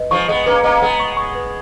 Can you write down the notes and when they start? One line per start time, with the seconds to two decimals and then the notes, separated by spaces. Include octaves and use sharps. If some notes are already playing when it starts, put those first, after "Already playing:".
Already playing: B4 D#5
0.11 F3 G#3 C#6
0.29 G#3 B3 D#5
0.46 A#3 C#4 B4
0.63 A#3 C#4 D#5
0.82 G#3 B3 F#5
1.00 C#6
1.17 C#6
1.35 B4